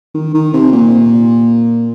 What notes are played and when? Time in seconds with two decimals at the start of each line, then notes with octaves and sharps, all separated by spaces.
0.14 D#3
0.34 D#3
0.53 C3
0.73 A#2